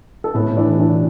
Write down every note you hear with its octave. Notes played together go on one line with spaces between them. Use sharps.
A4
A2 B3 B4
E3 D4 D5
E3 D4 D5